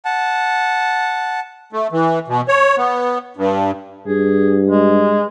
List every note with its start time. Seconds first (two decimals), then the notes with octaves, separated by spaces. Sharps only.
0.05 F#5 A5
1.73 A3
1.92 E3
2.28 B2
2.48 C#5
2.77 B3
3.37 G2
4.07 G2 G#4
4.69 G#3